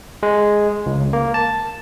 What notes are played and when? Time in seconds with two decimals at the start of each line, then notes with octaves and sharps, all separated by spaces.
0.23 G#3
0.86 C#2
1.13 A#3
1.34 A5